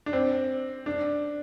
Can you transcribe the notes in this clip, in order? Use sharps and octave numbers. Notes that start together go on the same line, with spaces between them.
D4
C4
D4